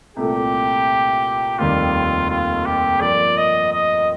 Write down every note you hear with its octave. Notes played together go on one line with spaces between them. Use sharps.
C2 A#2 A3 G4
F1 D#2 D#3 G3 F4
F4
G4
G2 F3 A#3 F4 D5
D#5
D#5